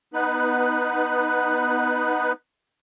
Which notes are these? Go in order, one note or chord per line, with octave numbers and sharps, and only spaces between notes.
B3 D#4 B4 F#6